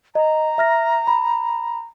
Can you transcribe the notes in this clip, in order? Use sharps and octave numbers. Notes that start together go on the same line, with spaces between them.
D#5 A#5
E5 F6 A#6
B5